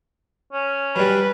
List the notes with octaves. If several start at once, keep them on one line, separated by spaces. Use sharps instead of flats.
C#4
F#3 G3 B4